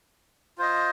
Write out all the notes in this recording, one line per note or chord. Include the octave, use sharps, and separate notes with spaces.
F4 C5 D#5